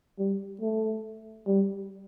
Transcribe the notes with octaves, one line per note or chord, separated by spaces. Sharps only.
G3
A3
G3